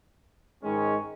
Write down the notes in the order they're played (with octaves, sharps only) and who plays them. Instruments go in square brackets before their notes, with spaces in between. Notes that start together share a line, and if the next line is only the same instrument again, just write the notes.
[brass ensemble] G#2 D#3 G#3 C#4